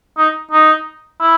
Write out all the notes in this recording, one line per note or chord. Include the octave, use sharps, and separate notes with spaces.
D#4
D#4
E4